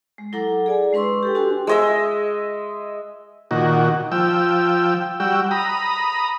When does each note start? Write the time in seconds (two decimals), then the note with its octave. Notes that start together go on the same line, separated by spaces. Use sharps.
0.18 G#3
0.33 F#3 E4 A4 F#5 A#5 D6
0.66 G#4 D5 G#5
0.93 G#3 D4 B4 C6 C#6 E6
1.23 G4 A4 G5
1.35 D4 F#4 G4 G#5 C6
1.67 G#3 D#5 E5
3.51 A#2 D#3 F#4
4.12 F3 G5 E6
5.20 G3 F#4 G5 E6
5.51 A#5 B5 D#6